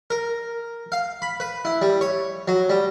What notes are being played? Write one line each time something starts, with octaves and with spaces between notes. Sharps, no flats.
A#4
F5
B5
B4
E4
G3
C#5
F#3
G3